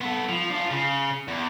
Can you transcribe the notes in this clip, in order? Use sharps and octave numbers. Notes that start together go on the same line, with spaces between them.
B3 A4
F3
D4 F4
C#3
E2